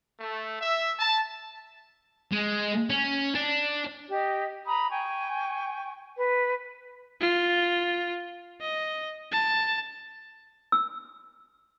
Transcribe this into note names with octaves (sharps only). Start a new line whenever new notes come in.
A3
E5
A5
G#3
C#4
D4
G4 D#5
A#5 B5 D#6
G5 G#5 C#6
B4
F4
D#5
A5
E6